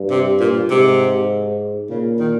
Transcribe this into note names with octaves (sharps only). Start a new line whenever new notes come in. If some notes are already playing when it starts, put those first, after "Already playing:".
Already playing: G2
C3
A#2
G#2 C3
A#2 C#3
D#3